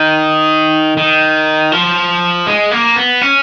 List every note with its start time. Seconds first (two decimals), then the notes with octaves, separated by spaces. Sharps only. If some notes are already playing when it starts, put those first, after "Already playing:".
Already playing: D#3
0.97 D#3
1.72 F3
2.47 G#3
2.71 A#3
2.96 B3
3.21 C#4